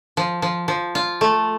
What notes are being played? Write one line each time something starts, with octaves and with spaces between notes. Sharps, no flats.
F3
F3
F3
F4
A3